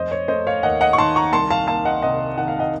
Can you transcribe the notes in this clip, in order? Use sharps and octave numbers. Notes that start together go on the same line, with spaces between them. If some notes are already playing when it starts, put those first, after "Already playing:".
Already playing: F1 C5 D#5
C#5
A3 C5 D#5
C#5 F5
D#2 D#5 F#5
D#5 F#5
C#6
D#3 A5 C6
A#5 C#6
C2 A5 C6
F5 A5
A#3 F5 A5
D#5 F#5
C3 D#5 F#5
D#3 F#5
F5
D#5 F#5